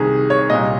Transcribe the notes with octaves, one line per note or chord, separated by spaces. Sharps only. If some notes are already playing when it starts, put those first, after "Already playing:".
Already playing: C2 C3 D#3 G#4
C#5
C2 A#2 D#5